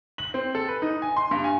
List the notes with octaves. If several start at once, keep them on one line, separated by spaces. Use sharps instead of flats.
F#7
C4
A4
B4
D#4
G#5
C6
G2
G#5